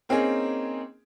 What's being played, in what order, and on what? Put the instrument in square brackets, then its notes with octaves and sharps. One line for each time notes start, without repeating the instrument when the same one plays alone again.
[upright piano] A#3 C4 C#4 D#4 G#4